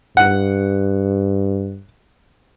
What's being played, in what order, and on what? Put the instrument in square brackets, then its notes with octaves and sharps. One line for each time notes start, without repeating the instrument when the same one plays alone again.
[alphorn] G2 [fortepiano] F#5